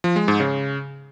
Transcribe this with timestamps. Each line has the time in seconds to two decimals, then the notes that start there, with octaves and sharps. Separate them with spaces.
0.04 F3
0.16 G#3
0.28 G#2
0.40 C#3